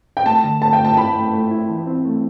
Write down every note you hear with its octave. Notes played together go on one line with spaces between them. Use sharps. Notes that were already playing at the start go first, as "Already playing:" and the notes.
G5
A3 A5
D3
A3 A5
G5
A3
A5
E4 B5
A3
A3
E4
E3
C4
A3